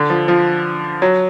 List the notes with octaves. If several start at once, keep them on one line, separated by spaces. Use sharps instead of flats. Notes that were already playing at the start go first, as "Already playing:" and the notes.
Already playing: D3
F3
F3
F#3